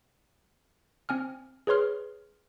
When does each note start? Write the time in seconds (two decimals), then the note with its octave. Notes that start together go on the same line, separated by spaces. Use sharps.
1.09 C4 G#5 F6
1.67 G#4 B4 C#5 C6 F6